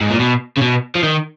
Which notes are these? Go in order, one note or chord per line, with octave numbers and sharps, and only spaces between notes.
G#2
A#2
B2
C#3
B2
F3
D#3